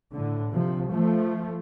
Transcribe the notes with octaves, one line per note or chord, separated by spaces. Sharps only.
A2 D3
C3 F3
F3 A3